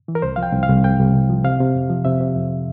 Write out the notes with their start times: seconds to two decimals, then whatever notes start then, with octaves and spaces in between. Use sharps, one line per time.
0.08 E3
0.15 A#4
0.22 C2 C5
0.36 F3 F5
0.43 G5
0.53 C2
0.63 F5
0.69 C2
0.84 C2 G5
0.99 C2
1.14 C3
1.30 F3
1.44 C3 F5
1.60 C3
1.75 F2
1.90 F3
2.05 C3 E5
2.21 C3
2.36 F2